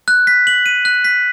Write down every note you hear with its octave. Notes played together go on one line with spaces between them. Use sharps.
F#6
B6
F#7
D#7
F#6
B6